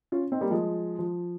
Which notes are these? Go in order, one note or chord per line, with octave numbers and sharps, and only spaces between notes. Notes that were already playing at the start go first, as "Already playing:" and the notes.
C#4 F4
C4 D#4
G3 A#3
F3 G#3
F3